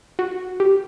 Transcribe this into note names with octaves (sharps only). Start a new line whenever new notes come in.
F#4
G4